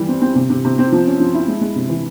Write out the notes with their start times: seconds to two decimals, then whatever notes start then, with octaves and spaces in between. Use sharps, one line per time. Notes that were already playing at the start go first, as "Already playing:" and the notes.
Already playing: E3 G3
0.09 C4
0.21 C4
0.35 C3
0.50 C3
0.65 C3
0.78 C4
0.92 F3
1.07 C#4
1.20 F3
1.34 E4
1.48 G#3
1.61 G#3
1.76 C3
1.89 E3